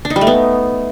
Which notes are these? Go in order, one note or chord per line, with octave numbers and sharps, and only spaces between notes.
D4
D#4
G3
A3
B3